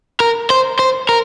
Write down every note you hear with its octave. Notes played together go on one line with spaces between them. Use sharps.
A#4
C5
C5
A#4